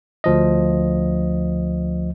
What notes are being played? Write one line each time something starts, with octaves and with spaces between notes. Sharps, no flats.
D2 F3 D#5